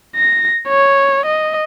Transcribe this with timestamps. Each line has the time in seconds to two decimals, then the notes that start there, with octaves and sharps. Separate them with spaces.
0.16 A#6
0.68 C#5
1.26 D#5